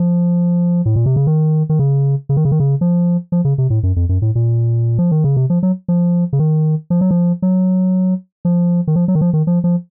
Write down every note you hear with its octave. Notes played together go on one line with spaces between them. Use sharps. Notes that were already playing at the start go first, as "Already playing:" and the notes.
Already playing: F3
A2
A#2
C3
C#3
D#3
D#3
C#3
C#3
D#3
C#3
D#3
C#3
F3
F3
C#3
C3
A2
F#2
F2
F#2
A2
A#2
F3
D#3
C#3
C3
F3
F#3
F3
C#3
D#3
F3
F#3
F3
F#3
F3
D#3
F3
F#3
D#3
F3
D#3
F3
F3